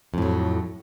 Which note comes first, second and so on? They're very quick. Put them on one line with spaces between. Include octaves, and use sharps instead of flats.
F2 A2 F#3